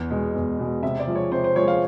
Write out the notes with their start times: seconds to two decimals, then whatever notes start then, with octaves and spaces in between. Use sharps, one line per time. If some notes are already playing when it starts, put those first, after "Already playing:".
Already playing: E2
0.10 B2 G#3
0.35 E2
0.59 B2 G#3
0.83 C3 E5
1.00 D5
1.07 F3 G#3
1.15 C#5
1.31 C3 C5
1.44 C5
1.56 F3 G#3 C#5
1.68 F5